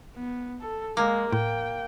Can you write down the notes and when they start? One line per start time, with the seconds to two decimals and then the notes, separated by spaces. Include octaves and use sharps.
0.16 B3
0.61 A4
0.97 G#3 A#3 D6
1.33 A2 G5